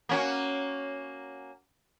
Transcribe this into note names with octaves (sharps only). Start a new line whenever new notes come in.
A#3 C#4 F#4